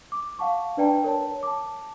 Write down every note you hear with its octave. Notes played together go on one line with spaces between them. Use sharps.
D6
F5 F#5 A5 C#6
D4 B4 D5 G5 A5 A#5
A#4 C#5 A5
A5 D6